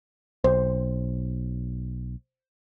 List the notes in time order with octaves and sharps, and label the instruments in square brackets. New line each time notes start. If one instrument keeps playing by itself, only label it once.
[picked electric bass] B1 [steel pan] C5